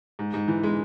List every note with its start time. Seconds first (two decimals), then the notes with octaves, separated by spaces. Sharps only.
0.19 G#2
0.34 G#2
0.48 E3
0.63 G#3